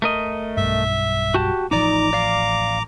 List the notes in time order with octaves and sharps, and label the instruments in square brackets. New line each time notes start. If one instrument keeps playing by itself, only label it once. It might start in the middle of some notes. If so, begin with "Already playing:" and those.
[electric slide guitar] A3 A#4 D#5
[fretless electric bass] B1 G2 [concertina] E5
[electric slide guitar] F#4 G4 A5
[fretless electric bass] A1 F3 [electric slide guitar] D#4 D5 [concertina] A#5 D6
[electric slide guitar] D5 F5